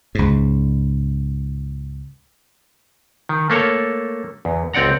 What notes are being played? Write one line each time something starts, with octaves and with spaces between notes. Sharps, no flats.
C#2 G#2
D#3
A3 A#3 A4 C#5
E2
C#2 C4 D5 F#5 A#5